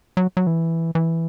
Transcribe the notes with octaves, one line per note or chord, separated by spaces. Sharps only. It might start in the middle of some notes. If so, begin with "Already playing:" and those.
F#3
F#3
E3
E3